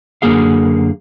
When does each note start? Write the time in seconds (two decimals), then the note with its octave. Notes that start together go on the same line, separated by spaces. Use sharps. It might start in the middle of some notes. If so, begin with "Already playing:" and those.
0.22 F#2 D3 A#3 G#4 F5